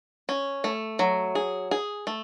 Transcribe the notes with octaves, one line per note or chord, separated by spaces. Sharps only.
C#4
A3
F#3
G#4
G#4
A3